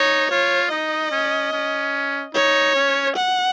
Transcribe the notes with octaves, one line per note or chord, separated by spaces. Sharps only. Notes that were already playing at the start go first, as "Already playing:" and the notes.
Already playing: D#4 C#5
F4 C#5
D#4 D#5
C#4
C#4
D#4 C#5
C#4
F#5